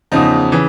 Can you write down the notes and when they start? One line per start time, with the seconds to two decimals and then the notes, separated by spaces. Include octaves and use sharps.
0.12 E2 C#3 F3 D#4
0.52 C#3 E3